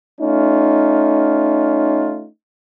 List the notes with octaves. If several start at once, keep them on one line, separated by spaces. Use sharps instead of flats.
A3 C#4 D#4 F4